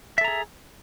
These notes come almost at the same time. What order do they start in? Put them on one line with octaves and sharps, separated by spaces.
E5 A4 A#5 G#4